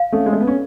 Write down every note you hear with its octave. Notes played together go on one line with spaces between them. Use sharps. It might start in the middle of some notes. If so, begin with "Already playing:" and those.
Already playing: F5
A3 C#4 A4
G#3
A3 D5
B3
C#4